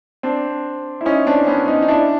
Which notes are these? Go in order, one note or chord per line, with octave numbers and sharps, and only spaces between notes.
C4 D4
E4
C#4 D#4
C4 D4
B3 C#4
C#4 D#4
D#4
D4 E4